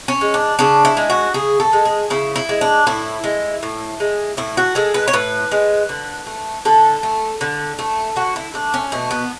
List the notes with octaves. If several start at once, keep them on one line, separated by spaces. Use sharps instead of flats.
C#4
G#3
D4
C#3 D4
E4
G#3
F#4
C#3 G#4
A4
G#3
G#4
C#3 E4
E4
G#3
D4
A2 E4
G#3
A2
G#3
A2 E4
F#4
G#3 A4
B4
C#5
A2 B4
G#3
D3
A3
D3 A4
A3
D3
A3
D3 F#4
E4
A3 D4
C#4
B2 A3
B3